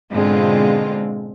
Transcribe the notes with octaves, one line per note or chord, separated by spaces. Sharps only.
G#2 B2 D3 G#3 C4 F4